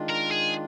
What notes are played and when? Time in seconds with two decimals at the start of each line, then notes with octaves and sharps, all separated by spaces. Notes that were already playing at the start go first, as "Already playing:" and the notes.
Already playing: D#3 G#3 D4 F4
0.09 A#4
0.31 G#4